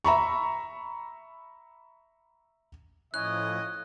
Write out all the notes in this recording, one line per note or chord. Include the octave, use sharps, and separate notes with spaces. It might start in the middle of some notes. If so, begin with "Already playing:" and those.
E5 A#5 B5 C#6
A2 F3 C#4 E4 C#5 D#5 F#6